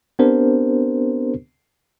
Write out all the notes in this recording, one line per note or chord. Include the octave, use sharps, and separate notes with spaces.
B3 C4 D4 G4 A#4 C5